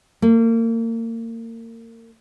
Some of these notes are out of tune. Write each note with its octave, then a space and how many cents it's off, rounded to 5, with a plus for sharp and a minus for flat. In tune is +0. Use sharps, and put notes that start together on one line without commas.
A#3 -35